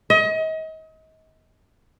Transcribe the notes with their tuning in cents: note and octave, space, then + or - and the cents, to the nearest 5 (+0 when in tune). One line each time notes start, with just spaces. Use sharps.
D#5 +35